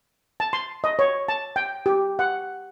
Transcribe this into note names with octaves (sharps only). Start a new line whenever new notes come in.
A5
C6
D#5
C#5
A5
G5
G4
F#5